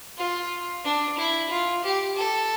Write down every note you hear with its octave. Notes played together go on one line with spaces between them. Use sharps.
F4
D4
E4
F4
G4
A4